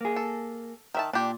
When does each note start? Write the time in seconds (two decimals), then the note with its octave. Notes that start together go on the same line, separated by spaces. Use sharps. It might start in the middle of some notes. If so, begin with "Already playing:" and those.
0.01 A#3 G#4
0.16 A4
0.94 D#3 E5 A5
1.13 A#2 D4 G4